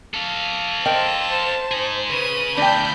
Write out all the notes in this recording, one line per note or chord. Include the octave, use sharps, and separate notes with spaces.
A4 F5
A#4 C5 D#5 G5 A5
D#4 G#4
C#3 B4 D#7
D2 F3 D4 G5 A5 B5 G6